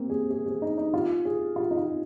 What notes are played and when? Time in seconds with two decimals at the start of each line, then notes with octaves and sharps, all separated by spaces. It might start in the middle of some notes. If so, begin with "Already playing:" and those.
Already playing: A#3 C4
0.10 G#4
0.30 G#4
0.46 G#4
0.62 D#4
0.78 D#4
0.94 F4
1.25 G#4
1.56 F4
1.71 D#4
1.77 F4